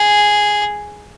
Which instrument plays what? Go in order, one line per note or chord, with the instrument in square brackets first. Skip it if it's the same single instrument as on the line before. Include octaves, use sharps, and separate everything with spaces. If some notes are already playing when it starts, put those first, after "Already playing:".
Already playing: [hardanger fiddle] G#4